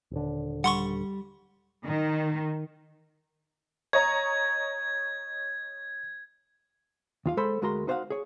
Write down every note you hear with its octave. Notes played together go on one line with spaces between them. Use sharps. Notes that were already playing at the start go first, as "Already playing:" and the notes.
D#1 D3
G3 F#5 C6 C#6
D#3
C#5 D#5 A#5 G#6
D#2 F4 F5
G#3 A4 C5 B5 C6
D2 G#3 F#4 A#4 A#5 C6
D#4 F#4 C5 D5 F5 F#5
G#4 C#5